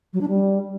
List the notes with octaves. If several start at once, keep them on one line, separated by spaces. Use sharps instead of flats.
F#3
D4
G3